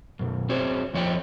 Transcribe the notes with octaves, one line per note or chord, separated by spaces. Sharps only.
F#2 B2
C4 F#4 G#4 C5 C#5
F2 F3 C#5 D#5 G5